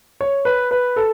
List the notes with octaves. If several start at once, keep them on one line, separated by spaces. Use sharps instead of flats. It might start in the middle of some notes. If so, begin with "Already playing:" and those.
C#5
B4
B4
A4